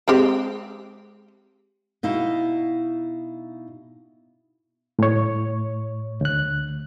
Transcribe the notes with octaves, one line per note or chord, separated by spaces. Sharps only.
G#3 C4 G4
B2 D#4 E4 F5
A2 C#5
D2 F#6